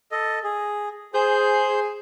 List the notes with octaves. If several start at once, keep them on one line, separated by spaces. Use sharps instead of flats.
A4 D#5
G#4
G#4 C5 G6